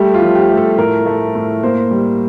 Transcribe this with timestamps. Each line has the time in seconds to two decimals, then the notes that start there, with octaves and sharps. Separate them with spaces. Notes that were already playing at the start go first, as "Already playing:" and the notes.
Already playing: G3 A3 G4
0.14 F4
0.22 F3
0.35 G4
0.50 A3
0.57 A4
0.78 A2 A#4
1.06 A3
1.35 A2
1.63 A#3 C5
1.91 G3